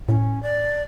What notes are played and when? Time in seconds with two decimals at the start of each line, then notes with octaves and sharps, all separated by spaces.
0.09 A2 C#4
0.43 D5